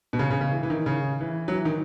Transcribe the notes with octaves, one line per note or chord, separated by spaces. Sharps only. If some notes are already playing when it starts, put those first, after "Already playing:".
B2
C#3
C#3
C#3
E3
E3
D#3
C#3
E3
F#3
E3
D#3